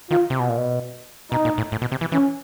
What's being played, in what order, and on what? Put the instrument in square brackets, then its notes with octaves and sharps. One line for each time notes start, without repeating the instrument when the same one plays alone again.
[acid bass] D#3 [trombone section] F4
[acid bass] C3
B2
A#2
B2
[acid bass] B2 [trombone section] D#4
[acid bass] A#2
A2
A2
B2
C3
E3
[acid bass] E3 [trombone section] C#4